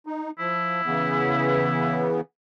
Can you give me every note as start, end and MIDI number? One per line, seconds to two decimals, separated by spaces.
0.07 0.31 63
0.39 0.81 53
0.39 2.11 64
0.86 2.21 49
0.86 2.21 52
0.86 2.21 59